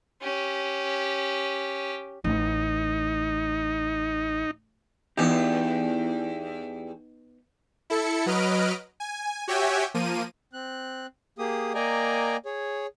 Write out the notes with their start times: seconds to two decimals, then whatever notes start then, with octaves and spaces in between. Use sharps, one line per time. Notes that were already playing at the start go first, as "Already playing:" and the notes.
0.22 C#4 G4
2.24 A1 D#4
5.17 E2 B3 D#4 G4
7.90 E4 A4 C#7
8.26 F#3 B4 D#5 F6 D7
9.00 G#5
9.48 F#4 G4 C#5 E5 G5 G#5
9.94 F3 A#3 D#7
10.53 C4 F#6
11.38 A#3 G4 G#4 D#6
11.74 A#3 D5 D#5 G5 G#5 A#5
12.45 G#4 C#5